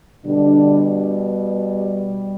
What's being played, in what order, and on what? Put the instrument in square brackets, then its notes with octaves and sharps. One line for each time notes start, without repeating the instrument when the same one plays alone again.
[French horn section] B2 D3 G3 D4